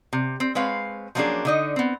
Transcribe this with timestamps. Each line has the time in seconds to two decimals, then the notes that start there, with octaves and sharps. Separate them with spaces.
0.13 C3
0.40 C4
0.55 G#3 C4 B4 C#5 F5
1.15 F3 F#3 A#3 C#4 D4 G#4
1.45 D3 D#4 D#5
1.76 B3 C4